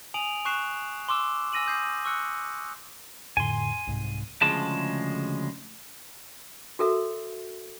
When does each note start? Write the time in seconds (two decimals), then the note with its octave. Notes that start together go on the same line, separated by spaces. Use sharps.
0.14 G#5 D#6 D7 F7 F#7
0.45 C#6 F#6 C7 E7
1.09 C6 D6 E6 E7
1.53 G#5 E6 A#6 D#7 F#7
1.66 D#6 G6 C7
2.05 C#6 E6 F#6 C#7
3.37 F2 A2 D3 G#5 C6
3.87 C2 G#2 C3
4.42 D2 C#3 F3 G#3 A5
6.79 F#4 A4 A#4 E5